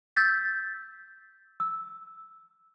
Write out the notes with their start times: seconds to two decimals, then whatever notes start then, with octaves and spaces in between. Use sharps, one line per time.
0.16 E6 G6 A6 B6
1.60 E6